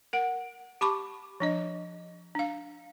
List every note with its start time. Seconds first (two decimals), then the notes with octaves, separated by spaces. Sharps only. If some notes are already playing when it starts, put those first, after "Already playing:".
0.13 A#4 F#5
0.81 G4 A5 B5 C#6 D6
1.40 F3 D4 D#5
2.35 D4 F5